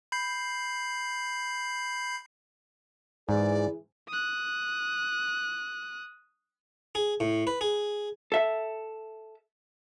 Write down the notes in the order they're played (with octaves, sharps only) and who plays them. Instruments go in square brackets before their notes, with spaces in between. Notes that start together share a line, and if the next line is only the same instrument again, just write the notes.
[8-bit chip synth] B5 G6 C7
[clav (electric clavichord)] G#2 [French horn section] E3 G#4 [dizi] D5
[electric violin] D#6 F#6
[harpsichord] G#4
A2
B4
G#4
[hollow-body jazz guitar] A4 E5